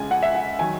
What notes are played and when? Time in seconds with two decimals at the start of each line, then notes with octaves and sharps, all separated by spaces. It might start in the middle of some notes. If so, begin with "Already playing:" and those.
Already playing: C#2 C#3 G#3 G#5
0.11 F#5
0.23 E5
0.35 F#5
0.59 D#3 F#3 G#5